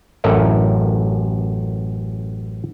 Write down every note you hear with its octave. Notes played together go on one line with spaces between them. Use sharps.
A1 F#2 A4 A#4 D#5 E5